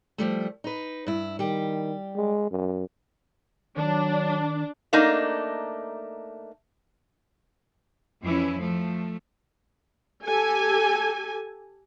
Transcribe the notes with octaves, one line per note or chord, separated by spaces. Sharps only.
F3 G3 A3
D#4 B4
G2 E4
D#3 G3 G4
G#3
F#2
D#3 F#3 D4
A3 A#3 D4 D#4
F2 E3 C#4 E4
F3 A3
G4 A4 G#5